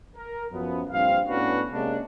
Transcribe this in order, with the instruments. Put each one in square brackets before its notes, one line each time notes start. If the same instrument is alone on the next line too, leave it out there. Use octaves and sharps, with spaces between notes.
[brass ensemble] A#4
F#2 F3 B3
A#1 G2 C4 F5
A2 B3 C#4 D4 F#4 B4
C3 G#3 A#3 C#4 D4